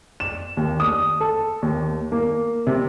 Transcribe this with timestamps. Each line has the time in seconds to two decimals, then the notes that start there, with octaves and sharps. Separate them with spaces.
0.20 E7
0.57 D#2
0.80 D#6
1.21 A4
1.62 D#2
2.12 A#3
2.67 C3